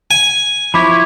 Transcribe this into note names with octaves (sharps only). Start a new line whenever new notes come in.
G#5
F3 E4 C#5 B5 D6